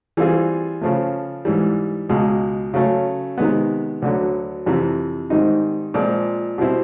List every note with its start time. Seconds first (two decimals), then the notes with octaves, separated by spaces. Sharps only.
0.17 E3 G3 C4 F4 G#4
0.82 C#3 F3 A3
1.45 G#2 E3 G3
2.09 C#2 B2 G#3
2.74 C#3 F#3 A3 C#4
3.38 C3 D#3 G#3 B3
4.02 D2 D3 F#3
4.66 F2 C3 E3
5.30 G#2 D#3 G3 C4 D#4
5.94 A#2 F3 G#3 C4
6.58 B2 G3 C4 E4